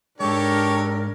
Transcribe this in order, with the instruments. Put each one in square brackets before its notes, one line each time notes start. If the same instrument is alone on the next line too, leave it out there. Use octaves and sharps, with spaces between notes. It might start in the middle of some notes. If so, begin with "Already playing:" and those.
[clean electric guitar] G#2 G#3 [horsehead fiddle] D4 A#4 [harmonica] G4 A4 C#5